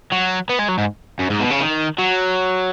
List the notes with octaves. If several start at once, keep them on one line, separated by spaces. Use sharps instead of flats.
F#3
B3
G#3
F#3
G#2
F#2
G#2
B2
C#3
D#3
F#3